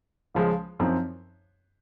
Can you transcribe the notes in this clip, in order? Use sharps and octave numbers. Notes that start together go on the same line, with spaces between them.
C#2 C#3 F3 G#3
F#2 F3 C4 D#4